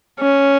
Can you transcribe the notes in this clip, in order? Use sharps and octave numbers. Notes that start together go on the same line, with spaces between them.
C#4